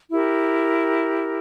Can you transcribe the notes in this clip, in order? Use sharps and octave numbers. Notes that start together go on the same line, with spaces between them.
E4 G4 A#4